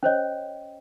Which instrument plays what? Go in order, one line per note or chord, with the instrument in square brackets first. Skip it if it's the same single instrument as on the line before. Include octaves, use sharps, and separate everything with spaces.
[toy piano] C#4 C5 C#5 [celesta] D#5 G5